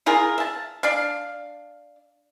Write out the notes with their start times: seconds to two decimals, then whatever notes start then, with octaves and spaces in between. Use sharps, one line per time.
0.06 E4 F4 G#4 A#4
0.38 E5 A5
0.83 D4 F5